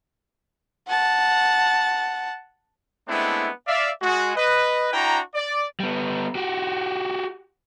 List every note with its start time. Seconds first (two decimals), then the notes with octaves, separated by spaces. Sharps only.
0.88 F#5 A5
3.08 G#3 A3 B3 C4 D4 E4
3.67 D5 E5 F5
4.02 G#3 F#4
4.36 B4 D#5
4.93 D4 E4 F#4 G5 A#5
5.35 D5
5.80 G3 B3
6.35 F#4 G4